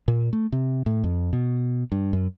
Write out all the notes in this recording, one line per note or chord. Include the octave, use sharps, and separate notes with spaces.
A#2
A3
C3
A2
F2
B2
G2
F#2